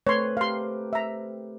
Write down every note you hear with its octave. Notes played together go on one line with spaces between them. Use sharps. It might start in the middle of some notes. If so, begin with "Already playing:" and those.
A3 C4 B4 C#5 C6
G4 A#4 F5 C6
E5 A#5